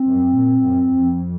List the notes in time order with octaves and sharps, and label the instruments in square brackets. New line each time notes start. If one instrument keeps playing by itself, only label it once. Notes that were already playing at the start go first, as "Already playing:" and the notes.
Already playing: [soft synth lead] C4
[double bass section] F#2
A#2
F#2
F2